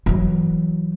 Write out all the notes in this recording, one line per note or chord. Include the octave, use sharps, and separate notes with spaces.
E3 F#3